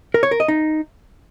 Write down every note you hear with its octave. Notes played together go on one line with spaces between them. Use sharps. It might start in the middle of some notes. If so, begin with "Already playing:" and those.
A#4
C#5
A#4
D#5
D#4